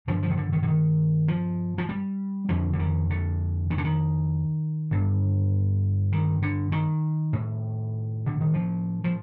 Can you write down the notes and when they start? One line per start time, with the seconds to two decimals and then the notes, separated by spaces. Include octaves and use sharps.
0.07 G2 D3 F3
0.22 F3
0.30 D#3
0.37 D3
0.52 D#3
0.62 D3
0.67 D#3
1.28 F3
1.78 F3
1.89 G3
2.49 F2 D3 F3
2.73 D3
2.79 D#3
3.10 D3
3.70 D#3
3.78 D3
3.84 D#3
4.91 G2 D3
6.12 D#3
6.42 D3
6.72 D#3
7.33 A2
8.26 D3
8.40 D#3
8.54 F3
9.04 F3